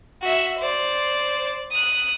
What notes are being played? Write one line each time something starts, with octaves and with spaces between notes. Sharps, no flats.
F#4 E5
C5 D5
D#6 F#6